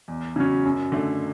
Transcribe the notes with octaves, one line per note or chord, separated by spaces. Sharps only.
E2
C#3 F#3 C#4
F#2
D3 A3